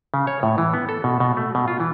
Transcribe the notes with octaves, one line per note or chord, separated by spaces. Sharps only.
C#3
C#5
A2
E3
B3
A4
B2
B2
A3
B2
F4
E3